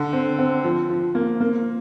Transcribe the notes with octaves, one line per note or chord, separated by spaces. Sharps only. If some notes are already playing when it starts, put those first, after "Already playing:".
Already playing: D3
C4
C4
F3
F3
A#3
A#3